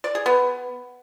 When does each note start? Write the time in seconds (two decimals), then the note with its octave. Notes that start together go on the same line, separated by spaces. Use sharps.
0.04 D5
0.15 G#4
0.26 B3